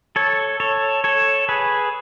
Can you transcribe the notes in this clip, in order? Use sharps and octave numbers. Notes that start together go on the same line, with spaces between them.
A4 C#5
A4 C#5
A4 C#5
G#4 B4